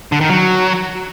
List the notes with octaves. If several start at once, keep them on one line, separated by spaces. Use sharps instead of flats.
D3
D#3
F#3